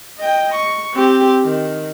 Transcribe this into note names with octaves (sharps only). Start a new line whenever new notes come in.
D#5 G5
C#6
C4 G4
D#3